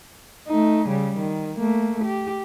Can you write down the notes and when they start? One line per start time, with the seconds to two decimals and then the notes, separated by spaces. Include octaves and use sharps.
0.48 A3 D#4
0.88 C#3 G3
1.18 D#3
1.57 A3 A#3
2.05 G4